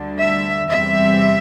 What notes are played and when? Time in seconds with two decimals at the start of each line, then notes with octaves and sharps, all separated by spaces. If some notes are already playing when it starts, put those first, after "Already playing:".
Already playing: D2 D3 G3
0.19 E5
0.68 E2 C3 G3 C4 E5